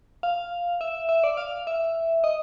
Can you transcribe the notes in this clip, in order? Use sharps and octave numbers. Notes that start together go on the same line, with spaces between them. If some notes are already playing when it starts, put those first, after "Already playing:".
F5
E5
E5
D5
F5
E5
D#5